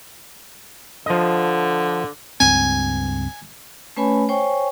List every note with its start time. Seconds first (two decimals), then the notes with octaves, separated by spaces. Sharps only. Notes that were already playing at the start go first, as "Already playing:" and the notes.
1.06 D3 F3 D#5
2.40 C#2 G2 C4 G#5
3.97 A3 C#4 B4 C#5 G#5 B5
4.29 C5 C#5 G5 G#5 C#6